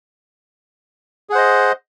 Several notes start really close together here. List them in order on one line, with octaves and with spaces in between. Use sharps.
G#4 F#5 C5 D#5